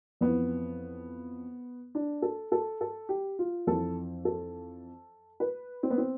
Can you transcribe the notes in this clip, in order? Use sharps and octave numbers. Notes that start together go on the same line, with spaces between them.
F2 E3 B3
D4
A4
A4
A4
G4
F4
F2 E3 A4
A4
B4
C4
B3
C4